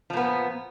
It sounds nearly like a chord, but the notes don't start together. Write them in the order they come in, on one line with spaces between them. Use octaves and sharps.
F3 A#2 B3